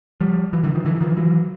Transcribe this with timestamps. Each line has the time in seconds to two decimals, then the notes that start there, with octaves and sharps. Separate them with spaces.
0.21 F3 G3
0.53 E3 F#3
0.63 D3 E3
0.75 D#3 F3
0.85 D3 E3
1.01 D#3 F3
1.17 E3 F#3